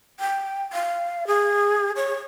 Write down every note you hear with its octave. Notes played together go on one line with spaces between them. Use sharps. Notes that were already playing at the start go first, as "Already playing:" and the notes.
G5
F5
G#4
C#5